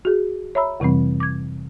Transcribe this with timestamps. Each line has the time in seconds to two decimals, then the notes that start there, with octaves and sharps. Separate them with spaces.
0.05 F#4 G#4
0.55 C#5 E5 A#5 B5 E6
0.80 F2 C3 E3 G3 C4
1.20 D6 G#6